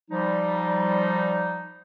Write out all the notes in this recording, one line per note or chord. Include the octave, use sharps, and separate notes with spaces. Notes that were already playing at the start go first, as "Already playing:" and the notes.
F3 G3 D#4